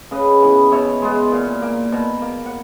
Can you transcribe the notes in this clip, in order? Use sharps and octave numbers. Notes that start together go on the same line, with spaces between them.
C#3 B4 D#5
E3 B3
B2 C#5 E5
G#3 B3
A#2
A#3
B2
A#3
F#5